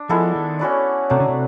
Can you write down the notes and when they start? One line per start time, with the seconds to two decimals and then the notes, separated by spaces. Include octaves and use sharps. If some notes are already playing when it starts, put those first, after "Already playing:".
Already playing: D4
0.09 F3 G#3 B3 E4 A4
0.35 D#3
0.59 C#4 F#4 B4 D5
1.10 C3 F#3 A3 D4
1.20 C#3
1.28 C3